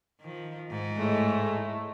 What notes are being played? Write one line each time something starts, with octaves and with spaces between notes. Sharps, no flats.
D#3 F3
G#2 D#4
A2 G#3 A3